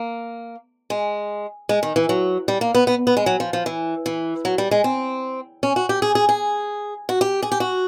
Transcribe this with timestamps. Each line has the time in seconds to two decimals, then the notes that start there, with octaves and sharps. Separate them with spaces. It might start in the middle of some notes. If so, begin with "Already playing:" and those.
Already playing: A#3
0.90 G#3
1.69 G#3
1.83 D#3
1.96 E3
2.09 F#3
2.48 G3
2.61 A#3
2.75 B3
2.87 B3
3.07 B3
3.17 G#3
3.26 F#3
3.40 F3
3.53 F3
3.66 E3
4.06 E3
4.45 F#3
4.58 G3
4.71 G#3
4.84 C4
5.63 C#4
5.76 F#4
5.89 G4
6.02 G#4
6.15 G#4
6.29 G#4
7.09 F#4
7.21 G4
7.42 G#4
7.52 G4
7.60 F#4